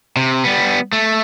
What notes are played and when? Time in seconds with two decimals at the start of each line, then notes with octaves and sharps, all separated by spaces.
0.16 C3
0.45 G3 B3
0.93 A3